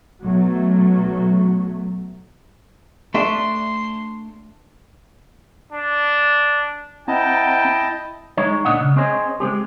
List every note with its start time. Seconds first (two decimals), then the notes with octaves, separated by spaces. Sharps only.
0.24 B1 F#3 A3
3.14 A3 D4 E5 C6
5.72 D4
7.08 C4 E4 D#5 F#5 G5 A5 A#5
8.37 G#3 D#4 C#5
8.65 D2 A#2 D4 D#5 F#5
8.81 C#3
8.96 C4 C#4 G#4 C5 C#5 D#5
9.40 G#3 A3 C4 G4